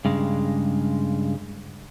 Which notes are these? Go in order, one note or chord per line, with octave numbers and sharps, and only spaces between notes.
G2 C#3 G#3